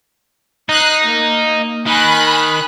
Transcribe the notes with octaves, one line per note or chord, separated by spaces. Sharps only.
D#4 D#6 F#6 C7
A#3
D#3 G#5 B5 F#6